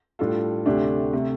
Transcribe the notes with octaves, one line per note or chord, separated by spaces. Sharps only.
A2 G3 D4 F4 A4
D2 C3 A3 D4 G4
C3 A3